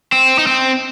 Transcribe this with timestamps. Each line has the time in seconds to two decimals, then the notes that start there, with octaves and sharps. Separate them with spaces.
0.12 C4
0.39 D#4
0.47 C4